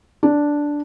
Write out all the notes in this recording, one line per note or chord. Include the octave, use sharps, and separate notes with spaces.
D4